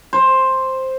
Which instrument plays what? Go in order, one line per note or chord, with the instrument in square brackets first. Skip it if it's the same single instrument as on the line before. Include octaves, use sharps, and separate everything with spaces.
[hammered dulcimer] C5